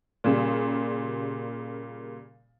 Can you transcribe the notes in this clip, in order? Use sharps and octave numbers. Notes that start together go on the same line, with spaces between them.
A#2 C#3 G3